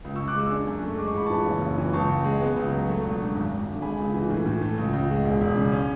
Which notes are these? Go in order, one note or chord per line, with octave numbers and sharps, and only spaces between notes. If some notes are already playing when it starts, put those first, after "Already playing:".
C#2
C#6 E6
C#2
D6 F#6
G#3 C#6 E6
D4
F#2
A3
G#3 D6
C#6
A1 B5
E3 A5 C#6
F#1
F#1
E3
C#2 A5 C#6
C#2
G#3
B3
C#2
F#3
A3
E1
D3
G#1
G#1
D3
G#3 G#5 B5
C#2
E3
A2
A2
A3
C#2
C#2
G#3
E1
E1
C#3
C#4